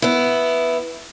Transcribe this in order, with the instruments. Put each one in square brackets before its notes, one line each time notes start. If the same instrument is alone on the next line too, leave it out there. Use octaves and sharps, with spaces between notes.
[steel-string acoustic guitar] B3 E4